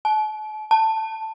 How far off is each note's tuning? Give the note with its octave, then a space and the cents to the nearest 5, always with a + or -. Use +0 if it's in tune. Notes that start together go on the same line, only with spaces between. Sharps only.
A5 -40
A5 +10